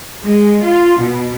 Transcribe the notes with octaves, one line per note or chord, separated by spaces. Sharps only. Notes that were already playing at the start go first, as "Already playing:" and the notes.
G#3
F4
B2